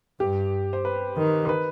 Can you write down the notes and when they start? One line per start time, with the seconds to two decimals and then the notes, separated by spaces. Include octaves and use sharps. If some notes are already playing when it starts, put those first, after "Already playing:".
0.20 G2 G4
0.73 C5
0.85 B4
1.17 D#3
1.49 B4